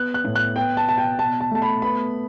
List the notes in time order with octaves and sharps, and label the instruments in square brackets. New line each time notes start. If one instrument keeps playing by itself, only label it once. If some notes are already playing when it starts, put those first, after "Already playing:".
Already playing: [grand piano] B3 F#6
F#6
A2
F#6
B3 G5
A5
B2 A5
G5
B2 A5
A5
A3 A5
B5
B3 B5